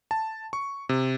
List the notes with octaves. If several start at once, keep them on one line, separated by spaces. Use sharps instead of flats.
A5
C#6
C3